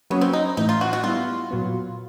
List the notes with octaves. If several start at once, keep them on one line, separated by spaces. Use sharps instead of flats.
F#3 A#3 B3 C#4 F#4
C4
D#4
A2 E3 A3 D#4
F4
F#4
F#4
G3 B3 E4 F4
A#2 F#3 B3